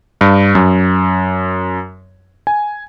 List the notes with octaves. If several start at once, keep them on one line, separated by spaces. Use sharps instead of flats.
G2
F#2
G#5